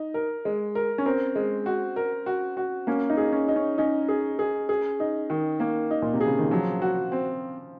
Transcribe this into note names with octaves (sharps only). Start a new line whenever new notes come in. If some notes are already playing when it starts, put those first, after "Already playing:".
Already playing: D#4
A#4
G#3
A#4
C#4
C4 A#4
G#3
F#4
A#4
F#4
F#4
A#3 C#4
D#4
G#4
C#4
D#4
C#4
C#4 D#4
G#4
G#4
G#4
D#4
D#3
A#3
D#4
A#2
C3
G#4
C#3
D#3
F3 F#3
F#4
C4